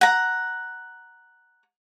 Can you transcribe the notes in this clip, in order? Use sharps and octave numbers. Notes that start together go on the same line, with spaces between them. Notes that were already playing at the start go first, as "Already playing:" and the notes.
F#5 A#5